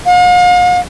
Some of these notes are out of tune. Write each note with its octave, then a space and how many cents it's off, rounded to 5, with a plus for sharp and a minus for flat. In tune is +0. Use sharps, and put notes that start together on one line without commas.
F5 +45